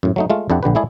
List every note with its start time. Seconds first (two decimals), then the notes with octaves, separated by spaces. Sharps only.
0.03 F#2 A2
0.16 F#3 A3 D#4
0.30 G#3 A3 F4
0.50 F2 D4 E4 G4 F#5
0.63 A#1 D3 G4 B4
0.75 G#3 A3 E4 G#4 D5